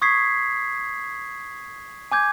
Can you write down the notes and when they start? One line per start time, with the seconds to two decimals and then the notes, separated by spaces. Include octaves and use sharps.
0.02 C#6 D#6 G#6 B6 C7
2.12 G#5 D6 G6 G#6